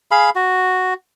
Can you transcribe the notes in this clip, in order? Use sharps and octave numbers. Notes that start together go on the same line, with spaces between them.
G#4 F5 B5
F#4